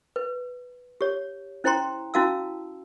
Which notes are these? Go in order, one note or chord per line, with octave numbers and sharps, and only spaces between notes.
B4
G4 C#5
C#4 E4 C5 G5 A#5 C6
C#4 E4 F#4 F5 A5 E6